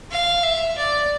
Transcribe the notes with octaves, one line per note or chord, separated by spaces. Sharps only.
F5
E5
D5